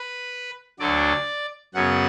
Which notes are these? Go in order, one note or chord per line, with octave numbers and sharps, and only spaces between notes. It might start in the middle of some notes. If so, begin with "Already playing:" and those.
Already playing: B4
D2 D3 F#3 D5
F#2 C#3 F#3 B3 F#5